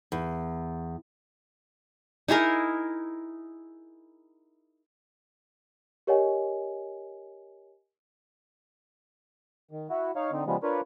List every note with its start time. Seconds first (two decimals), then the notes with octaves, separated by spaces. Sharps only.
0.12 E2
2.28 D#4 E4 G#4 A#4
6.07 G4 A#4 C#5 D#5 F#5 G#5
9.71 D#3
9.90 E4 F#4
10.16 D#4 C#5 F5
10.32 D3 C4 D#4
10.47 C#3 F3 G3 G#3 B3
10.63 D4 F4 A#4 B4 C#5